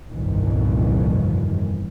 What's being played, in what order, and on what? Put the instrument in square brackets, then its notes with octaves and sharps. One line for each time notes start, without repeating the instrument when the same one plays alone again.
[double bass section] G1 C2 F2 A#2 D#3 E3